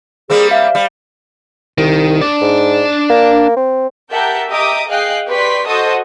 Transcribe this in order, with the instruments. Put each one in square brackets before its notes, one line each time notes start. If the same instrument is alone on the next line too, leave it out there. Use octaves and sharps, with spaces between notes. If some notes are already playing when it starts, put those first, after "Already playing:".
[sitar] G3 A#3 C4 [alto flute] G#4
[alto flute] E5 [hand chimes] F5
[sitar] G3
[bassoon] C2 [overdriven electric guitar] D#3
[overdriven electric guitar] D4 D5
[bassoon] G#2
A#3
C4
[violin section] G4 A#4 E5 F#5 A5 G6
G4 D#5 E5 A#5 D6 D#6
G#4 D#5 F5 G5 F#6 C7
G4 B4 D5 C6 C#6 B6
F#4 A4 C5 D#5 C#6 D#6